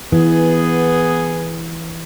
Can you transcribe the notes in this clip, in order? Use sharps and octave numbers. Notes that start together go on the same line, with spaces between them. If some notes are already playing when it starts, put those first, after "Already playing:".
E3 B3 G#4